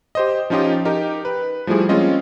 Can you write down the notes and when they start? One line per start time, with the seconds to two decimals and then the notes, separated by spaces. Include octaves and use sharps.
0.15 G4 C5 D#5
0.50 F3 C#4 D#4 F4 G4 D#5
0.85 D#4 G4 A#4
1.25 B4
1.67 F3 G3 A3 E4 G#4
1.89 G#3 A#3 C4 C#4 F4 D#5